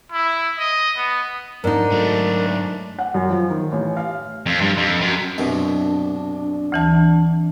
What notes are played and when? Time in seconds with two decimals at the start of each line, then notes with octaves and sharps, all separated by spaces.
0.12 E4
0.58 D#5
0.97 B3
1.64 G#2 D4 D#4 A#4
1.92 F#3 A3
2.99 F#5
3.14 F#2
3.30 F3
3.50 D#3
3.72 A1
3.97 F5
4.46 F2
4.61 G2
4.77 F2
5.01 F#2
5.38 C2 F#2 B2 D4
6.72 D2 E3 A5